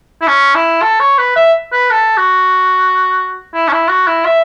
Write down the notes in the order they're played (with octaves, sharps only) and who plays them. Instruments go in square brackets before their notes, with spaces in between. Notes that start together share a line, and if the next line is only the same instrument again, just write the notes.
[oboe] E4
C#4
E4
A4
C#5
B4
E5
B4
A4
F#4
E4
C#4
E4
F#4
E4
E5